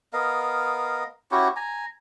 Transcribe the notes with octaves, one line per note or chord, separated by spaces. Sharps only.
B3 A#4 D#5 F5
C#4 E4 F#4 G4
G#5 A#5